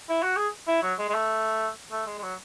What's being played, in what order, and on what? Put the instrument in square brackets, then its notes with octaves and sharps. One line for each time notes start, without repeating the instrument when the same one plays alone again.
[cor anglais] E4
F#4
G#4
E4
F#3
G#3
G#3
A3
A3
G#3
G#3
F#3